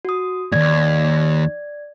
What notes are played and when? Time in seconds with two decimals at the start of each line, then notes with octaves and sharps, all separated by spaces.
0.05 F#4 D#6
0.52 D#2 G#2 D5 G#6